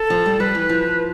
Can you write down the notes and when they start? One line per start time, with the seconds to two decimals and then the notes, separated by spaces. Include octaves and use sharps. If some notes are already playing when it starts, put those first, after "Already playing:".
Already playing: A4
0.10 F3
0.26 G3
0.40 G3 B4
0.55 E3
0.69 F3